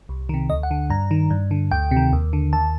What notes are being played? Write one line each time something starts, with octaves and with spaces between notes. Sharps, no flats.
C2
C3 D#3
D2 D#5
F#5
D3
G2 A#5
D#3
G2
D3
D2 G5
C3
D#3
D#2
D3
D#2 A5